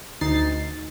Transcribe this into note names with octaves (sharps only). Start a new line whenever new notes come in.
D2 D#4 A6 C7